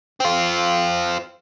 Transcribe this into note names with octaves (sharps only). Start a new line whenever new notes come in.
C4 F4